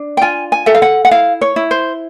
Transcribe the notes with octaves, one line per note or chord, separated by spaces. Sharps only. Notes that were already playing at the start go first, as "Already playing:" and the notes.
Already playing: D4
G5
F4 G#5
G#5
A4 E5
F5
F#5
F#5
E4 F5
C#5
E4
C5